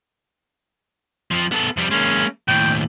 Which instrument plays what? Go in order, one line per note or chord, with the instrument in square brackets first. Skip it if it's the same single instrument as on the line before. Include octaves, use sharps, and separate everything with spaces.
[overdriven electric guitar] F2 F3
B3 A4
F2 G3
[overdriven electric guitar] G#3 A#3 [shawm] C#4
[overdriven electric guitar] D#2 A2 [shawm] G5